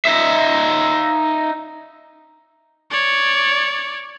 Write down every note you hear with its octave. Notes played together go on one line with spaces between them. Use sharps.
D#4 E5
C#5 D5